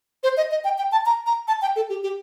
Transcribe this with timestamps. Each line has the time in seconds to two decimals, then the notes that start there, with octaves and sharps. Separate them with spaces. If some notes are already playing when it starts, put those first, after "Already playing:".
0.24 C5
0.37 D#5
0.51 D#5
0.64 G5
0.78 G5
0.92 A5
1.06 A#5
1.26 A#5
1.48 A5
1.62 G5
1.76 A4
1.89 G4
2.03 G4